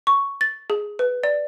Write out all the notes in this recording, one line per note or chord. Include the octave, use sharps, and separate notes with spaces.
C#6
A6
G#4
B4
D5